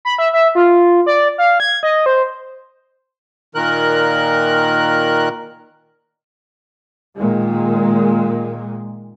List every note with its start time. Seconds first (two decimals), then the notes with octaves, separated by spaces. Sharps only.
0.05 B5
0.18 E5
0.33 E5
0.55 F4
1.06 D5
1.38 F5
1.60 G#6
1.83 D#5
2.06 C5
3.55 A#2 D#3 A#4 F#6
7.17 A#2 D#3 G#3